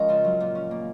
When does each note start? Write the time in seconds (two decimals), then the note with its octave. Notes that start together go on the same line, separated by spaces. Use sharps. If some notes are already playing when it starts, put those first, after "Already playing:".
Already playing: F3 G#3 C#4 A#4 C#5 D#5 F5
0.08 C#3 F4
0.24 F#3
0.40 A#2
0.55 C#4
0.71 A#3